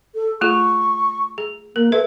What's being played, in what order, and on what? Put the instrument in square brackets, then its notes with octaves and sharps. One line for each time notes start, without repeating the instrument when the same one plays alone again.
[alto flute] A4
[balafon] A3 F4 G#4 [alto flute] C#6
[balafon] G#4
[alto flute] A#3 [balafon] A#4
[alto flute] A4 [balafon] B4 E5